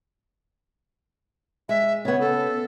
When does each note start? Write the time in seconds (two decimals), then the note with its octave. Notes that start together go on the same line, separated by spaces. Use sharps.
1.69 G#3 E5
2.05 C#3 B3 C#5
2.20 A4